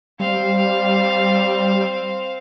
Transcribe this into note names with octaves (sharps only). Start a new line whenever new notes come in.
G3 C4 F5